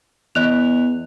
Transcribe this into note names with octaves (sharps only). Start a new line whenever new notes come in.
E2 D#5 F#6 F7